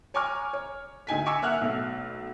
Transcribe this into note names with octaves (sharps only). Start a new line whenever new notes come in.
C#5 G#5 A#5 C#6 D6 F6
C#5
D2 D#4 G#5 B6
G#5 A#5 C#6 D6 E6 C#7
A#3 E5 F#5 F6 F#6
B1 B2 A3